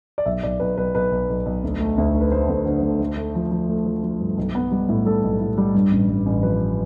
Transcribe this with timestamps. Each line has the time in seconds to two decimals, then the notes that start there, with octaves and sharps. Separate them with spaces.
0.18 D5
0.26 B1 E5
0.43 B1 D5
0.60 B1 B4
0.78 B1 B4
0.95 B1 B4
1.11 B1
1.29 B1
1.46 B1
1.64 D2
1.80 A3
1.98 D2
2.15 A3
2.21 B4
2.31 A3 C5
2.49 D2
2.66 D3
2.82 D2
3.00 A3
3.17 A3
3.35 F3
3.52 F3
3.69 A3
3.86 F3
4.03 F3
4.20 G2
4.37 B1
4.55 B3
4.71 G3
4.89 A2
5.05 G3 A4
5.24 B1
5.41 A2
5.58 G3
5.74 G2
5.91 A1
6.09 G2
6.26 A1
6.43 F3 B4